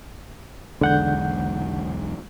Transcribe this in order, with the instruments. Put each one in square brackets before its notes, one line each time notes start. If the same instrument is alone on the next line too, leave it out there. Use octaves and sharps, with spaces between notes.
[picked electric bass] B1 E2 G#3 [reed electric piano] D3 F#5 G6